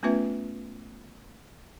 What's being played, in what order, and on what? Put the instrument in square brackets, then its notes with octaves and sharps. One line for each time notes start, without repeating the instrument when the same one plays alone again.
[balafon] A3 B3 C#4 F4 B4 E5